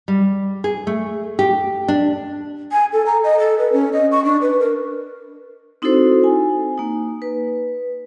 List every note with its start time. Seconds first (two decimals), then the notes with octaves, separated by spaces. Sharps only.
0.08 G3
0.64 G#4
0.87 A3
1.39 G4
1.88 D4
2.72 G#5
2.93 A4
3.06 A#5
3.24 D#5
3.39 A4
3.58 B4
3.73 C#4
3.93 D#5
4.12 C#6
4.25 D4
4.42 B4
4.60 A#4
5.82 C4 D#4 E4 F#4 A4 C5
6.24 G#5
6.77 A#3 D#4
7.22 B4